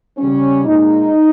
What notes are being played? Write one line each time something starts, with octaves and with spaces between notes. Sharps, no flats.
C#3 G3 C#4
A#2 G#3 D#4